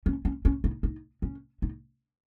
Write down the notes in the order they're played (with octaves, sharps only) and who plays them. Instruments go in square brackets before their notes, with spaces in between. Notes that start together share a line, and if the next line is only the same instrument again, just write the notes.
[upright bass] C#4
C#4
C#4
D#4
D#4
C#4
D#4